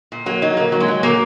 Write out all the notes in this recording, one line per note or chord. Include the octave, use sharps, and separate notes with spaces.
A#2
F#3 A#3
F#3 D#4
A#2 A#3
F#3
G#3
F#3
A#2 A#3